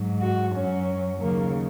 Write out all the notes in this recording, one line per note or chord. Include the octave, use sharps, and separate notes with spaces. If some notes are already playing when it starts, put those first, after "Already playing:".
Already playing: G#2 F#3
F#4
F#2 F#3 C#4
D#2 C#3 F#3 A#3